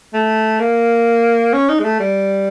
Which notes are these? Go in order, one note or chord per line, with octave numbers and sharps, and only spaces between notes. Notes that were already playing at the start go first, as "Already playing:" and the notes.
A3
A#3
C#4
D#4
G#3
A3
G3